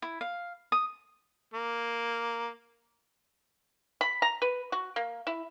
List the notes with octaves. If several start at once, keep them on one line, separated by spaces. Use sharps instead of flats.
E4
F5
D#6
A#3
B5
A#5
B4
F#4
A#3
E4